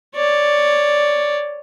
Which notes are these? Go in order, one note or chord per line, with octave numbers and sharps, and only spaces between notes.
C#5 D5